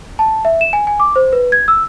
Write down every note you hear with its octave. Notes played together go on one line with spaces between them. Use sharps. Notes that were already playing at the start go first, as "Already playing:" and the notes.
A5
E5
E7
G#5
G#5
D6
C5
B4
G#6
E6